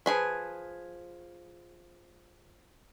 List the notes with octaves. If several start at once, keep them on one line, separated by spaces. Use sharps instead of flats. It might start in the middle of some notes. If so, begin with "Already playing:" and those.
F3 A#3 G#4 B4